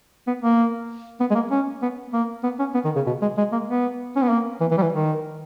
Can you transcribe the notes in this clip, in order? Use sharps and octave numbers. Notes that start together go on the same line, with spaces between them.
B3
A#3
B3
G#3
A#3
C#4
B3
A#3
B3
C#4
B3
D#3
C#3
B2
G#3
G#3
A#3
B3
C#4
B3
A#3
E3
E3
G3
E3
D#3